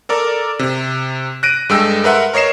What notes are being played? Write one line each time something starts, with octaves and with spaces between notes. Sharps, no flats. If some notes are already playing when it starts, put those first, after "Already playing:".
A4 A#4 D5
C3
F#6 A#6 D7 D#7
G2 G#3 A4 D#5 G5 E6
A#4 B4 E5 F#5 C6
A#4 C#5 D#5 C7 E7